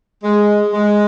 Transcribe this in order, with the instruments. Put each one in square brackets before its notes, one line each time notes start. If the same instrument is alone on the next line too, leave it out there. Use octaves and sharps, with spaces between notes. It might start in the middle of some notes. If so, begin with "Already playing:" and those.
[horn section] G#3
G#3